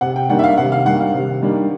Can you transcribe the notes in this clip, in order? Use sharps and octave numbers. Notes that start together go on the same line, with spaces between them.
C3 F#5
G5
D#3 G3 A#3 D4 F#5
E5
F5
C3 F#5
F5
D#3 G3 A#3 D4 F#5
F5
C3
D#3 G3 A#3 D4